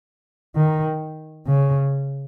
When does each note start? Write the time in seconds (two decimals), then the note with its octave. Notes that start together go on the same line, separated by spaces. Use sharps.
0.56 D#3
1.47 C#3